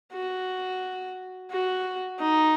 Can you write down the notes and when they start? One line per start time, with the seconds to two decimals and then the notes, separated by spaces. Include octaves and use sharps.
0.13 F#4
1.51 F#4
2.19 D#4